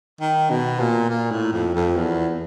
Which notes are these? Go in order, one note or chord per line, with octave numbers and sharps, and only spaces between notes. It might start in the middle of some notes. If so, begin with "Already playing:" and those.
D#3
B2
A#2
A#2
A2
F2
F2
E2